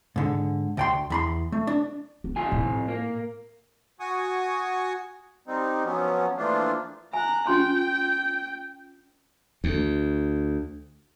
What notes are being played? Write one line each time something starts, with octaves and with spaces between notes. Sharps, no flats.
G#2 D3
D2 G5 C6
E2 B5 C6
A3
D4
B3
F2 F4 G#5
A2
A#3
F#4 G#5 C#6 D#6
G3 C4 D#4
F3 F#3 B3 C#4
E3 F3 A3 A#3 D4 F4
G#5 A#5 F#6
C#4 F4 G5 C6
D2